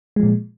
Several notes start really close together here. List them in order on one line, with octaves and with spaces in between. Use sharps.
G#3 F3 A#2